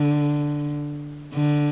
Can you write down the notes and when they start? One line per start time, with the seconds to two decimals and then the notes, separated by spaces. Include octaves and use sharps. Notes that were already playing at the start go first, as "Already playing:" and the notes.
Already playing: D3
1.34 D3